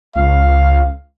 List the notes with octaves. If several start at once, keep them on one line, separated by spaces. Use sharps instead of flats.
C#2 F5